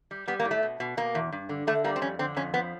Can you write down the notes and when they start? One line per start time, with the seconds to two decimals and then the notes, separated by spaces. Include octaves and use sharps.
0.11 G3
0.28 G3 B3
0.40 A#3
0.45 A2
0.51 A3
0.62 B2
0.80 B2
0.97 B2 A#3
1.15 E2
1.32 G2
1.49 D3
1.67 D3 A3
1.84 G3 A#3
1.96 C4
2.01 F2 C#4
2.19 D3 C4
2.36 F2 C#4
2.54 F3 B3